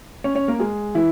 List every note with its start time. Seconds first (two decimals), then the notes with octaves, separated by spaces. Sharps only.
0.24 C#4 C#5
0.35 C#4 C#5
0.48 A#3 A#4
0.59 G#3 G#4
0.95 E3 E4